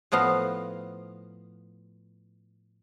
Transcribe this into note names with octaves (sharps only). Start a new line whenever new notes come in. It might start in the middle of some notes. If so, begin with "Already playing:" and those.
A2 F3 B3 D#5 F5